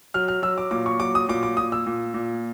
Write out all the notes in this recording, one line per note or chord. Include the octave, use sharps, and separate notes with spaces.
F#3 F6
F6
F#3 E6
D6
A#2 D6
C#6
F#3 D6
D#6
A#2 D6
D6
A#2 D#6
E6
A#2
A#2